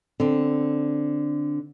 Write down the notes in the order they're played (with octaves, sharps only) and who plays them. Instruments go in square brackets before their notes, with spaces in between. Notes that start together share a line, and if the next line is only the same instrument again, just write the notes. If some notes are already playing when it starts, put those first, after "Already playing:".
[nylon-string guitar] D3 C4